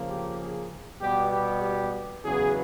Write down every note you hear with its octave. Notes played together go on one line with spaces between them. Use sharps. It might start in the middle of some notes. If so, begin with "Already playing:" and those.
Already playing: C#3 F3 A#3
G4
G#4
B2 G3 B3 G4
G4
G4
E2 C#3 F#3 B3 G#4